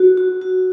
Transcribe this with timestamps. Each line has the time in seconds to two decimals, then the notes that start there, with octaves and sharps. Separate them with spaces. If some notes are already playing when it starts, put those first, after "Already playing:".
Already playing: F#4
0.17 F#4
0.42 F#4